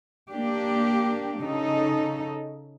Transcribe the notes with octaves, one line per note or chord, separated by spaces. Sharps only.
A#3 D4 G4
C#3 D#4 A4